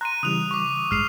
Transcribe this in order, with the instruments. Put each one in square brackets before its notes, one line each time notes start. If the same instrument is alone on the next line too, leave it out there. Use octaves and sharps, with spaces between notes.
[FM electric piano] A#5 C6 [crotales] F#6 D#7
[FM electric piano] C#3 E3 G3 [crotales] D#6 F#6 F7
[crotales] C#6 D6
[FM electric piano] A1 G2 G#3 [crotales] F6 C7 F7